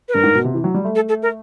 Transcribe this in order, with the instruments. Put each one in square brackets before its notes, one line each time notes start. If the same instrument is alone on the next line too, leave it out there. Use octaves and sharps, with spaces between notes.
[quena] B4
[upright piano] G2 [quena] A#4
[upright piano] G#2
B2
C3
E3
F#3
G3
A3
[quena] A4
A4
A#4